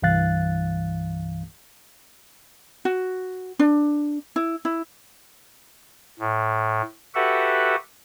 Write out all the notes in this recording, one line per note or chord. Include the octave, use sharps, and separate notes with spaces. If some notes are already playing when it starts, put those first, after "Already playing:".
C2 G2 E3 F5 F#6 A6
F#4
D4
E4
E4
A2
F#4 G4 A4 B4 E5 F#5